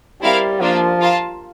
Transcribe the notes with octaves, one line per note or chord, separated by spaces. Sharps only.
G3 C4 E4 A#4 F5
F3 A#3 D4 F4
F4 A#4 F5 A5